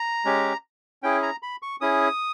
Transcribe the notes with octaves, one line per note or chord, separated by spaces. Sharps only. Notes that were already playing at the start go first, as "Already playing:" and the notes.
Already playing: A#5
G#3 C#4 G4
C#4 E4 G#4 G5
A#5
B5
C#6
C#4 E4 G#4 D#6